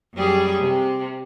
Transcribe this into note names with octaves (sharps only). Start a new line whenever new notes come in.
F#2 G3 G#4
C3